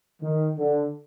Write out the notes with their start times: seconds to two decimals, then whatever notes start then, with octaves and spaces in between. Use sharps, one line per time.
0.21 D#3
0.57 D3